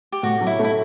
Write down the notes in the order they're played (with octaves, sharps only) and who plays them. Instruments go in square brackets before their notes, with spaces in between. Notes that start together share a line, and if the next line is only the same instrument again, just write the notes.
[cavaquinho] G4
[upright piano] A2 [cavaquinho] F#4
[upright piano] F#3
[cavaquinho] E4
[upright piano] A3
[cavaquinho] E4